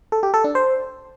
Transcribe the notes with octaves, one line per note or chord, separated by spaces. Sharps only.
A4
G4
A4
D4
C5